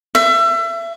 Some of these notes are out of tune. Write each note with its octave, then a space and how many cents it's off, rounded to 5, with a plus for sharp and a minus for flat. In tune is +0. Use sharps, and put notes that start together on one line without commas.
E5 +30